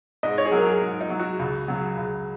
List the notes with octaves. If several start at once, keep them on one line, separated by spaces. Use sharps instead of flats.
G#2 D#5
C#5
G#4
F#3 A#4
G#4
G#2
D#4
F#3
F#4
C#2
C#3 F#3
C#2